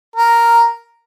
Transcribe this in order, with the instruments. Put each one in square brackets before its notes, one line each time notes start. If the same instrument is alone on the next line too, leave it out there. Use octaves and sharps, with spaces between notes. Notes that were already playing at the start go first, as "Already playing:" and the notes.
[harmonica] A#4